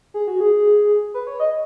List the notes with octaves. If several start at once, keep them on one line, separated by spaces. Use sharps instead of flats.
G#4
F#4
G#4
B4
C#5
D#5